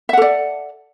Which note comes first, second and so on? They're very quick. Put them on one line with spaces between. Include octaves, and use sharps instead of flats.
E5 F#5 A4 D5